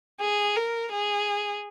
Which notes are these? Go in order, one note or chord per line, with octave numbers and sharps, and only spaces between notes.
G#4
A#4
G#4